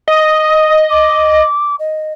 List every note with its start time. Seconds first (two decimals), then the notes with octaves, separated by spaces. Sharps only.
0.08 D#5 D#6
0.90 D6
1.79 D#5